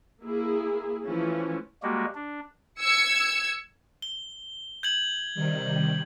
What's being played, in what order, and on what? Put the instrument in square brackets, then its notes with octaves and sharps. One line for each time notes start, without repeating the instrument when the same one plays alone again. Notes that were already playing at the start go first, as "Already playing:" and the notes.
[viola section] A#3 E4 G#4
E3 F3 A3 C#4 E4 F4
[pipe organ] G3 G#3 A#3 F#4 G4
D4
[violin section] E6 G#6 C#7
[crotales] G7
G6 G#6 F#7
[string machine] C3 D#3 G3